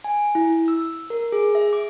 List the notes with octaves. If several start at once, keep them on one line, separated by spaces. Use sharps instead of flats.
G#5
E4
E6
A#4
G#4
E5
D6